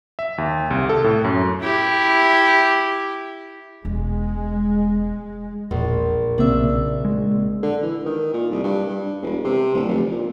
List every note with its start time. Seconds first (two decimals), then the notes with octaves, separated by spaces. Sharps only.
0.19 E5
0.38 D#2
0.71 C2
0.89 A4
1.04 A2
1.24 F#2
1.61 E4 G4
3.85 E1 G#3
5.71 E1 A#1
6.38 B1 C#3 A#3 C4 D4 E5
7.05 G#3
7.62 D3
7.83 E3
8.05 D#3
8.33 A#2
8.51 C2
8.64 G2
8.89 G2
9.22 E1
9.44 C3
9.74 D1
9.88 F1
10.11 A#2